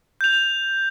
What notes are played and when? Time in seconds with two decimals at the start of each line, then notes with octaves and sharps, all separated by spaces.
0.21 G6 F7